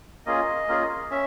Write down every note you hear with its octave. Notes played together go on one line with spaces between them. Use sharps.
A#3 C#4 F4 G#4 D#5
A#3 C#4 F4 G#4
C#4 E5